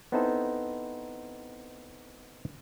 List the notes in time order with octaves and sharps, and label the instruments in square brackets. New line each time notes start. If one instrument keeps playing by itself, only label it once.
[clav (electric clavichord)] B3 C4 D#4 E4 A4 C5